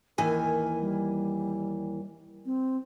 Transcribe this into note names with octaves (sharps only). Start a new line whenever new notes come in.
D#2 E3 A#4 G#5
G3
C4